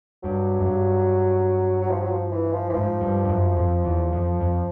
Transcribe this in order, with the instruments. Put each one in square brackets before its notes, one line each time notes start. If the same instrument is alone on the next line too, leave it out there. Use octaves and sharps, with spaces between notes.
[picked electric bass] G2 [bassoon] F#3
[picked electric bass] F#2
G2
[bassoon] F#3
F3
F#3
F3
E3
F3
E3
[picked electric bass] G#2 [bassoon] F3
[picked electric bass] G2
G2
F#2
F2
E2
F2
F2